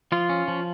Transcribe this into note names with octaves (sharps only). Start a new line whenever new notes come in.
F3 F4
C#4
F3